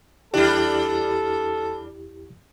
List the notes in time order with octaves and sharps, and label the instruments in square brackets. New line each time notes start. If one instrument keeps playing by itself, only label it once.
[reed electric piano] E2 E4 G4 [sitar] G3 D4 [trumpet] A4